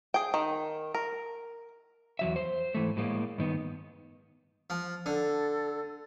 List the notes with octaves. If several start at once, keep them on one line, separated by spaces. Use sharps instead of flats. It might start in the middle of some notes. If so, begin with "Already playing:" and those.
G#4 G5
D#3
A#4
E2 F#3 E5
C5
G#2 E3 A3
A2 G#3 A#3
G2 D#3 B3
F3
D3 A4